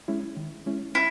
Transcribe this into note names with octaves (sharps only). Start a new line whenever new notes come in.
G#3 C#4 E4
D#3
G#3 C#4 E4
E4